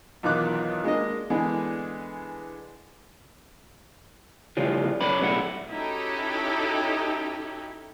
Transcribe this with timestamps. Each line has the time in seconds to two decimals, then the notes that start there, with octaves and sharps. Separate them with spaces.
0.23 B1 E2 D#3 F4 D6 F#6
0.84 G#3 A#3 D4 D#5
1.30 D3 E3 G#3 B3 D4 G#4
4.57 A2 C#3 F3 G3
5.01 F#2 C#4 B4 D5 B5
5.21 B1 A2 E4 F#5
5.69 C#4 D#4 E4 F#4 G4 A4